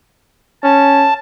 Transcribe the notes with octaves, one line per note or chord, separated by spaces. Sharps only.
C#4 A5